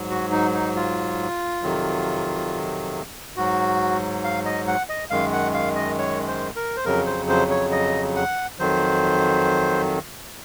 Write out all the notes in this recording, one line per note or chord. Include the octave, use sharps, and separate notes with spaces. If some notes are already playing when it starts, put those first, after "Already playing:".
Already playing: G#2 F#3
F#4
D#4
D#4
F4
F2 C3 D#3 F#3
G#2 F#3 F#4
F5
D#5
F#5
D#5
F#2 D#3 G#3 F5
F#5
F5
D#5
C#5
C5
A#4
C5
F2 C#3 F#3 A#4
C5
C5
C#5
D#5
F#5
F2 D#3 F#3 C5